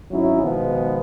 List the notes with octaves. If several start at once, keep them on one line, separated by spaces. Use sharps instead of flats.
G#1 F#3 C#4 D#4 E4
B2 D#3 F3 G#3 B3